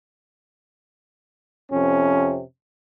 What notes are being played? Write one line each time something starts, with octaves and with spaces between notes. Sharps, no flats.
F2 C3 C#4